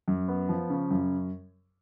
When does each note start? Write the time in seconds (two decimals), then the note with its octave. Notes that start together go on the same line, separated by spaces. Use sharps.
0.08 F#2
0.28 B3
0.49 F3
0.70 C#3
0.90 F#2